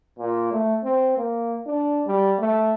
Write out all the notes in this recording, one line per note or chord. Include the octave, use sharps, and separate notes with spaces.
A#2
A3
C4
A#3
D4
G3
A3